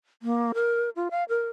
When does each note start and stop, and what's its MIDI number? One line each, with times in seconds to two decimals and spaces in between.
0.23 0.52 58
0.54 0.89 70
0.96 1.08 65
1.11 1.24 77
1.29 1.49 70